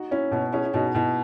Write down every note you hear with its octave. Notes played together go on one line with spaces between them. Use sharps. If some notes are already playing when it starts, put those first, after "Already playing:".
Already playing: D#4 F#4
C#4 E4
B2 E4
C#4 E4 G#4
E4
B2 D#4 F#4
B2 E4